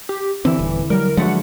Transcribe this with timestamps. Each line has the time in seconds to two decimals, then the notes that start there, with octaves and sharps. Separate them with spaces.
0.09 G4
0.45 D3 E3 C4 E4
0.59 D#1
0.90 F#3 G3 A#4
1.17 D3 F3 F#3 G#3 A3 F#4 F#5